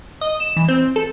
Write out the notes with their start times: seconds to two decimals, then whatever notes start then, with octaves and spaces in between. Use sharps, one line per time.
0.21 D#5
0.40 E7
0.56 E3
0.68 C4
0.96 A4